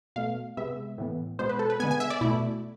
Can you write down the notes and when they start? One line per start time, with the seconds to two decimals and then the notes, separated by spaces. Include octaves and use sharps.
0.16 B2 A3 F5
0.57 C3 G#3 B3 E5
0.98 A2 E3 B3
1.39 B2 G#3 B3 C5
1.49 B4
1.59 A4
1.70 B4
1.80 D3 G#3 B3 G#5
1.91 G#5
2.00 E5
2.10 D5
2.21 B2 A3 E4